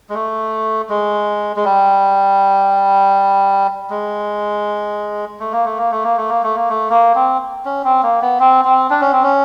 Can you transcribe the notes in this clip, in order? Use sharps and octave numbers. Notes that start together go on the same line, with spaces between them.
G#3
A3
G#3
G#3
G3
G#3
A3
A#3
A3
A#3
A3
A#3
A3
A#3
A3
A#3
A3
A#3
C4
C#4
C4
A#3
B3
C4
C4
D4
C#4
C4
C#4